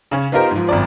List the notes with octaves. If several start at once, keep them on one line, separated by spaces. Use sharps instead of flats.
C#3 C#4
B3 D#4 F4 G4 A#4 C5
G#2 F3
G#1 F#2 D5